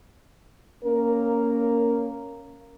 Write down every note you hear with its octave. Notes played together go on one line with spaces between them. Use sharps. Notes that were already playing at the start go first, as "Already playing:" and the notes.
A#3 C#4 A#4